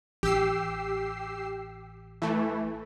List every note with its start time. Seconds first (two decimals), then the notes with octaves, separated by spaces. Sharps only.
0.23 A1 G4 E6 C7
2.22 E3 A3